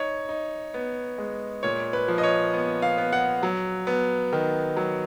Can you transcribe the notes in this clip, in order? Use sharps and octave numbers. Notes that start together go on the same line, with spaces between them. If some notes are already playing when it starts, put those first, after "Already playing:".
Already playing: D#4 C#5
D#4
B3
G#3
A#2 C#5
B4
F3
D#5
C#5
B3
F5
B3
F#5
F#3
B3
D#3
F#3